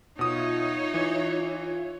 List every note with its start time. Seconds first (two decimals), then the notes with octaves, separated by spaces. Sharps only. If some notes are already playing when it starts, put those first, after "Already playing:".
0.19 B2 D#4 F4 C#5 E5 D#6
0.94 E3